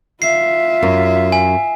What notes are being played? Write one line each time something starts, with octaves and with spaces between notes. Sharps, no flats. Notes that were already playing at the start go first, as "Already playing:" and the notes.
F4 E5 C7
F#2
G#5